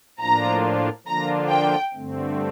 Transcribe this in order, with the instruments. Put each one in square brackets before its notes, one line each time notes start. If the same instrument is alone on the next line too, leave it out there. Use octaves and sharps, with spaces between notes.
[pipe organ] A2 F3 A#3 D4 F4 [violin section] A#5
[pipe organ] D3 F3 A#3 D4 F4 [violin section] A#5
[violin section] G5
[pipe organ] G2 D3 A3 C4